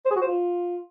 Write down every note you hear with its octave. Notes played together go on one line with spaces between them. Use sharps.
C5
G#4
F#4
C5
F4